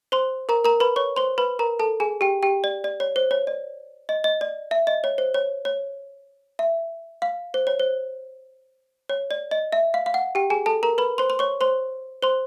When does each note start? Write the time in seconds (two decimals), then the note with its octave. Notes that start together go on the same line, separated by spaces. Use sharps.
0.12 C5 C6
0.49 A#4 A#5
0.65 A#4 A#5
0.80 B4 B5
0.96 C#5 C#6
1.16 C5 C6
1.38 B4 B5
1.59 A#4 A#5
1.79 A4 A5
2.00 G#4 G#5
2.21 G4 G5
2.43 G4 G5
2.64 D5
2.84 D5
3.00 C#5
3.16 C5
3.31 C#5
3.47 D5
4.09 D#5
4.24 D#5
4.41 D5
4.71 E5
4.87 D#5
5.04 C#5
5.18 C5
5.34 C#5
5.65 C#5
6.59 E5
7.22 F5
7.54 C5
7.67 C#5
7.79 C5
9.09 C#5
9.31 D5
9.51 D#5
9.72 E5
9.94 F5
10.06 F5
10.14 F#5
10.35 G4 G5
10.50 G#4 G#5
10.66 A4 A5
10.83 A#4 A#5
10.98 B4 B5
11.18 C5 C6
11.30 C6
11.39 C#5 C#6
11.61 C5 C6
12.22 C5 C6